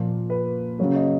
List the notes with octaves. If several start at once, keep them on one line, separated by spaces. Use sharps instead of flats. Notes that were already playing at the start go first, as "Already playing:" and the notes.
Already playing: A#2 F3 A#3
B4
C#3 F#3 A#3 C#5
D#5